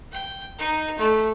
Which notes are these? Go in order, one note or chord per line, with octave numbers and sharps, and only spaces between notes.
G5
D#4
A3